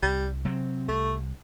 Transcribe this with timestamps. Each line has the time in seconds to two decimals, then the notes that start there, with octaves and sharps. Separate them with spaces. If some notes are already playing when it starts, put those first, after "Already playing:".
0.02 C2 G3
0.45 C3 F#3 C4
0.88 C2 A3